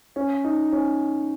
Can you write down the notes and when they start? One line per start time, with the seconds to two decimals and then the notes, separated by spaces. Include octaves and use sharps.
0.16 C#4
0.44 D#4
0.72 C#4